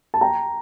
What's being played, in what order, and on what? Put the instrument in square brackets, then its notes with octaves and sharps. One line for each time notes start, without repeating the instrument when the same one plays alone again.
[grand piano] A5
G5 A#5